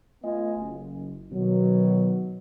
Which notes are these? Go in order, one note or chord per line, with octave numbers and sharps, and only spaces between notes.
A3 B3 F4 D#5 G#5
F#1
B2 D#3 F#3